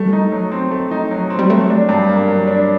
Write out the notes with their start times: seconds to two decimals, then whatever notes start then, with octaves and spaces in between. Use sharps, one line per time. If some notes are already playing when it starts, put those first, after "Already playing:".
Already playing: G3 A3
0.13 D#4
0.32 F#3
0.52 C4
0.71 A3
0.91 D#4
1.11 F#3
1.30 C4
1.39 G3
1.50 F#3 A3
1.70 D4
1.89 G2
2.09 A#3
2.28 F#3
2.47 D4